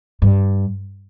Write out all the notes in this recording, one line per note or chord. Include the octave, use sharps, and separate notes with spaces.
G2